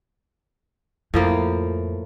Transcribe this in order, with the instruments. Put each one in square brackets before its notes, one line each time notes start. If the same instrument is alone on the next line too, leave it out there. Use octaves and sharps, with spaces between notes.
[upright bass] F2 [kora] A2 F3 A#3